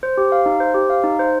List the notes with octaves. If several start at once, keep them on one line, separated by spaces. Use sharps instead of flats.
C5
G4
F5
D#4
C5
G4
F5
D#4
C5